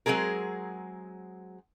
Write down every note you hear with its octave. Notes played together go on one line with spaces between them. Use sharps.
F#3 G#3 C4 G#4 A#4